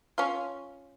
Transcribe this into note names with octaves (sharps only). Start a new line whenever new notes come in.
C#4 F4